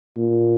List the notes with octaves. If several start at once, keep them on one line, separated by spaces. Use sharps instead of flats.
A#2